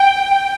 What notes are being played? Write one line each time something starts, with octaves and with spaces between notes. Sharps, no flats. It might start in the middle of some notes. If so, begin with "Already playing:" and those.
Already playing: G5